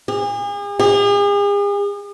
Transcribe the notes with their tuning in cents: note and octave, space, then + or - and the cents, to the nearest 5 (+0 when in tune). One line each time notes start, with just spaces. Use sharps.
G#4 -40
G#4 -45